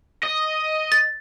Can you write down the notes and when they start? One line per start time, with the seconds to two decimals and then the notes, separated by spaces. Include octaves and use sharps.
0.23 D#5
0.92 A6